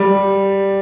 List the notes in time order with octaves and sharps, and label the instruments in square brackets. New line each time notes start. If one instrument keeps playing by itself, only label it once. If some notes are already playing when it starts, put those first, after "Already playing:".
Already playing: [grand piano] G3